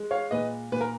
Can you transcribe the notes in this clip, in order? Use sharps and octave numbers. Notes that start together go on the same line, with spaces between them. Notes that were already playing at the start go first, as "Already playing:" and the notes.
Already playing: G#3
C#5 F5
A#2 B4 D#5
A#2 B4
A#4